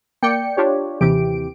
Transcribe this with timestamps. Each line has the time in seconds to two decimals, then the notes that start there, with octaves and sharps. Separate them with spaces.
0.23 A#3 D5 G5 C#7
0.57 D4 F4 G4 C#5
1.01 D#2 C3 E3 G4 D7